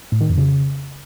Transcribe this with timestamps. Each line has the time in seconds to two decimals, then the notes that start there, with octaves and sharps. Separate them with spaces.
0.12 A2
0.21 D#3
0.29 F2
0.38 C#3